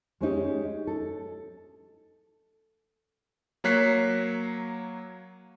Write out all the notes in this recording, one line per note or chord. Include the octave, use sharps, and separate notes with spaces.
G#3 C#4 D#4 G4
A4
F#3 A#3 C#5 F#6 B6 C7